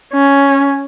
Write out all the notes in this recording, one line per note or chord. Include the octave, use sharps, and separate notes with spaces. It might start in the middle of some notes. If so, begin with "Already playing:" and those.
C#4